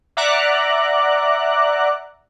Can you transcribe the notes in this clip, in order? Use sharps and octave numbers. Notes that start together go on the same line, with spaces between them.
D5 E5 F#5 A#5 D6 F#6